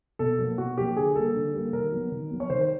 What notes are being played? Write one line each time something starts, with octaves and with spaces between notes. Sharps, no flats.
B2 A4
F#3 A#3
B2 F#4
F#3 A#3 G4
D3 G#4
G3 A#3 A4
D3
G3 A#3
D#3 A#4
F#3 B3
D#3
F#3 B3
C#5
D#3 C5
C5